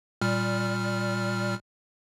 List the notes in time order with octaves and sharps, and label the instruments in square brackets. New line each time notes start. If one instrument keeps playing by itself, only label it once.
[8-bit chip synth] A#2 G3 F6